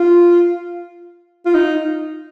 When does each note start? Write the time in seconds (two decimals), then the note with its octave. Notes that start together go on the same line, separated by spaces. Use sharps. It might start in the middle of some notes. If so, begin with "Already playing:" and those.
Already playing: F4
1.46 F4
1.55 D#4